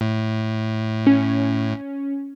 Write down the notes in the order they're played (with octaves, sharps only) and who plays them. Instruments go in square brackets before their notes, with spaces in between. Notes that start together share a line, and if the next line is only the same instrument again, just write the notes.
[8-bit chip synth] A2
[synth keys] C#4